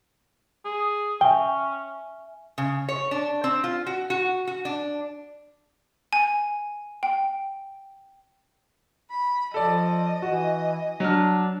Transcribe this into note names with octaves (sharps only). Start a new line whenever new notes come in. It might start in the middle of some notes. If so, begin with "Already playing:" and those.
G#4
C#4 E5 G5 G#5 G7
C#3
C#5
D4
C4
F4
F#4
F#4
F#4
D4
G#5
G5
B5
F3 A4 D5 D#5
E3 F#4
F#3 D4 F6